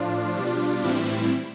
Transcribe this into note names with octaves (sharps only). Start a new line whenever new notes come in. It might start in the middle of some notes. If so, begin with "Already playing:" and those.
Already playing: A2 F3 D4 F4
B2 G3
A2 E3 G3 C4 E4